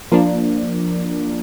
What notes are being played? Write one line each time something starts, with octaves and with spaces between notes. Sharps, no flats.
F3 A#3 D4